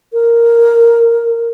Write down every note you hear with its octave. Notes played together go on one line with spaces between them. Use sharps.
A#4